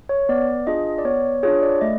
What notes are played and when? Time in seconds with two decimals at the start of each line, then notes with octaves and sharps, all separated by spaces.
0.09 C#5
0.29 B3 D5
0.67 D4 F4 G#4 D#5
0.98 D5
1.04 B3 C#5
1.43 D4 F4 G#4 C#5
1.62 D5
1.81 A3 D#5